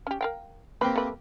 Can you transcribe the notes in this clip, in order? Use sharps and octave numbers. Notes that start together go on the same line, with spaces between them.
C#4 G4
A#4 F5 G5
A#3 C4 G4 B4
A3 B4